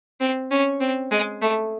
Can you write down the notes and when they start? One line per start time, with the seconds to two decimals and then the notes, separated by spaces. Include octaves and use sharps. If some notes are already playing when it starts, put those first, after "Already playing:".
0.20 C4
0.51 C#4
0.80 C4
1.11 G#3
1.42 A3